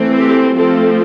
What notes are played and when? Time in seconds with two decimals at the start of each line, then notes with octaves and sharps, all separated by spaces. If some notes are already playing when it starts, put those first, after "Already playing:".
Already playing: E3 A3 C4
0.20 G4
0.57 F3 A3 C4 A4